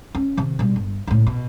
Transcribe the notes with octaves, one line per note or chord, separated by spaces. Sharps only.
C#4
C3 D#3
B2 G3
G1
A2 C#3
B2